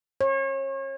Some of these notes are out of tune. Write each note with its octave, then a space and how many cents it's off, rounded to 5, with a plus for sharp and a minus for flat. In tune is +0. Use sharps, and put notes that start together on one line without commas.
C#5 -35